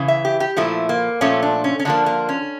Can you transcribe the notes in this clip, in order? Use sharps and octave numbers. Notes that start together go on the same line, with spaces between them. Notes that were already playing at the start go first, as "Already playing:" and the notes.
Already playing: C#3 E3
E5
G4
G4
A#2 F3 A3 E4
A#3
A#2 F3 A3 C#4
D4
C#4
C#4
D3 F3 A#3 D4
A#3
C#4